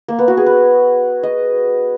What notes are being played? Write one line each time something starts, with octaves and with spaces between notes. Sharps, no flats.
A#3
B3
F#4
G#4
B4
D#5